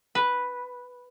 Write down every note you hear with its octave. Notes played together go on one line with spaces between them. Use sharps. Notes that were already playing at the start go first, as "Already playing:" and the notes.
B4